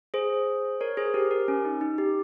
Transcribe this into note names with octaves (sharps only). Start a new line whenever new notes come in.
G#4 C5
A#4 C#5
G#4 C5
G4 A#4
G4 A#4
C#4
D#4
D#4
G4